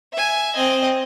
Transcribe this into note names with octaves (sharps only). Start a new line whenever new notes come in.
E5 G#5
C4 D#5